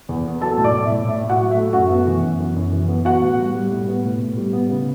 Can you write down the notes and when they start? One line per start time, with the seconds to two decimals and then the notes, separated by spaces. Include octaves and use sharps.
0.09 E2
0.25 B3
0.41 F#3 A4 A5
0.58 A2
0.64 D5 D6
0.74 A2
0.85 E5
0.92 A2
1.07 A2 E5
1.24 A2
1.30 F#4 F#5
1.41 F#3
1.51 E5
1.57 A3
1.73 F#2 F#4 F#5
1.90 B3
2.07 E3
2.22 F#2
2.40 F#2
2.56 F#2
2.73 E3
2.88 B3
3.05 B3 F#4 F#5
3.22 A2
3.38 G3
3.55 G3
3.71 A2
3.88 B3
4.05 A2
4.21 A2
4.37 G3
4.53 B3
4.70 C#3